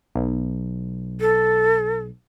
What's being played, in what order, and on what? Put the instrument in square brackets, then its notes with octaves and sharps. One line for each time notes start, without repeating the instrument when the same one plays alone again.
[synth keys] B1
[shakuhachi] A4